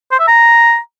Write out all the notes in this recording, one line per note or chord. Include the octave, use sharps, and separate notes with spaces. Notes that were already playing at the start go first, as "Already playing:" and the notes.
C5
E5
A#5